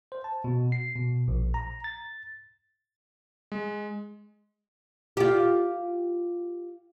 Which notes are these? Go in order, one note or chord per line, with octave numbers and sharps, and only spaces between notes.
C5
A5
B2
C7
B2
A#1
A#5
A6
G#3
F4 G4